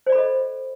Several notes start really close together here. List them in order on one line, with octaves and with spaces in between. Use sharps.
C5 D5 B5 A4 D#5